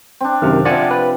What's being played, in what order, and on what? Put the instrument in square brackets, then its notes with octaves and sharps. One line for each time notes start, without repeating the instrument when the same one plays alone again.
[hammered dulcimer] C4 D4
[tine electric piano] F#2 C3 D#3 [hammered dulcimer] F5
[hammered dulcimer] C3 F3 [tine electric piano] D5 F#5 G#5
[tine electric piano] B4